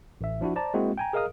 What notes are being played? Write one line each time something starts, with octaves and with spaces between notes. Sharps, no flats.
A1 E5
F3 D4 E4 F#4
C5 D5 A5 A#5
G#3 A#3 C4 E4 F#4
G5 G#5 A#5
G#4 A#4 D#5 F5 D#6 F6